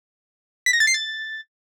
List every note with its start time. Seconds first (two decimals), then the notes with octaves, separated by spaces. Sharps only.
0.66 B6
0.73 A#6
0.80 A6
0.87 C7
0.94 A6